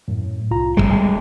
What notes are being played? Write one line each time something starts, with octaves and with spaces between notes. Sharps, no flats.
F#2 A2
C2 F4 A#5
D1 E2 G3 G#3